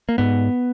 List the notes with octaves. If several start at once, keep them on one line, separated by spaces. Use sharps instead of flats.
A#3
G#2 B3